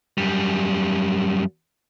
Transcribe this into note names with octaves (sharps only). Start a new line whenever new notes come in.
F#2 G3